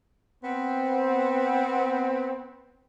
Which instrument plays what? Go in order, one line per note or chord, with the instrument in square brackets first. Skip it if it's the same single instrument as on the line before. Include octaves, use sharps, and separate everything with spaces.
[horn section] B3 C4